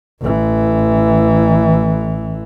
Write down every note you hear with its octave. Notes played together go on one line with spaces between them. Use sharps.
A1 E3